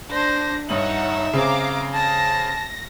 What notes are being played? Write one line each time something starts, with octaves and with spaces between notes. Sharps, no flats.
D4 C5 A#6
G2 D#4 C#5 E5 F#5 D#6 F#7
C#3 C4 G#4 F5 A#5 D6
A5 A#6